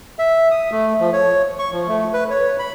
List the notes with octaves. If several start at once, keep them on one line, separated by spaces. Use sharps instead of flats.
E5
D#6
A3
F3
C#5
C#6
F3
A3
B4
C#5
B5